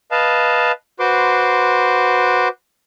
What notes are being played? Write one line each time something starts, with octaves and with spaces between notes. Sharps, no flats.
B4 D#5 F5 A5
F#4 B4 C5 C6 D6